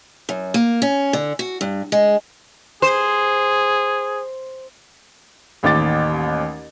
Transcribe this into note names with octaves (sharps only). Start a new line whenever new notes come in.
F#2
A#3
C#4
D3
F#4
G2
G#3
G#4 C5
A1 D#2 D6 A6